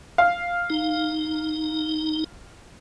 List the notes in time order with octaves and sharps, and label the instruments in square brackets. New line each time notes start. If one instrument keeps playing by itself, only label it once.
[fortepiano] F5
[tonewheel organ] D#4